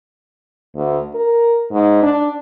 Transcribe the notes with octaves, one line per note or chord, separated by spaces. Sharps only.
D2
A#4
G#2
D4